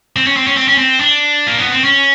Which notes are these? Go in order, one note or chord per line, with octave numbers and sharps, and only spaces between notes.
C4
C#4
C4
C#4
C4
C#4
C4
D4
A#3
B3
C4
C#4